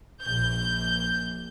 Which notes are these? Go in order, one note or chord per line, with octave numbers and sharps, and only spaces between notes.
A#1 G6